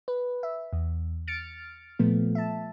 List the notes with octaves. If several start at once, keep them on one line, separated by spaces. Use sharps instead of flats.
B4
E5
E2
F6 A6 C#7 D7
A#2 F3 A3 B3
E5 A5